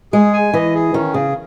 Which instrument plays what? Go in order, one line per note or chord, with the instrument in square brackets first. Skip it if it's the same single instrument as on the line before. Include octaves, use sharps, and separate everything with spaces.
[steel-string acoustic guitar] G#3 [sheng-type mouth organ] G#4
[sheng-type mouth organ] G#5
[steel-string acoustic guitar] E3 [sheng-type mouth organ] D#5
[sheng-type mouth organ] G#4
[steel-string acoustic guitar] D#3 [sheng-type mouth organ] C#4
[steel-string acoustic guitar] C#3 [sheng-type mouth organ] G#4